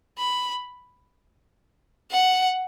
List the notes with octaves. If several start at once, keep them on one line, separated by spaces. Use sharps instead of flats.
B5
F#5